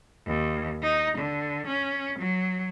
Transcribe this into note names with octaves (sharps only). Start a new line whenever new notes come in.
D#2
D#4
D3
C#4
F#3